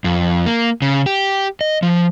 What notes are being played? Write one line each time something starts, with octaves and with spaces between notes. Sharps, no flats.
F2
A#3
C#3
G4
D#5
F3